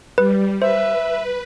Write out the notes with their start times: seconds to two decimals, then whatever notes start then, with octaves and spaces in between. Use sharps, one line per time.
0.18 G3 B4
0.62 B4 C5 E5